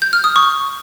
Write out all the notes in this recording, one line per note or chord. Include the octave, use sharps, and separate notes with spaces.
G6
F6
D#6
C#6